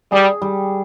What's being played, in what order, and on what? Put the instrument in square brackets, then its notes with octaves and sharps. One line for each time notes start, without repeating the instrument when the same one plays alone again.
[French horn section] G3 [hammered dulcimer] G#4
[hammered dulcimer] G3